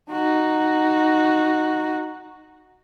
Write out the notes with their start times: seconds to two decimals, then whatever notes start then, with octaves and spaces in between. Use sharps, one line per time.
0.11 D#4 F#4